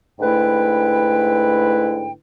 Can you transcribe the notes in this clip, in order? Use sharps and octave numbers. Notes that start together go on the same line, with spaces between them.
G#2 D3 A3 E4 B4 G5